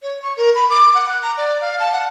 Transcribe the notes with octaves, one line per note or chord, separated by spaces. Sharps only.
C#5
C#6
A#4
B5
D6
F#5
F#6
A#5
D5
F5
A5
F#5